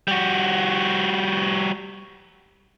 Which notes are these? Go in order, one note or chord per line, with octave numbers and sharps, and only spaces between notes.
G3 F#4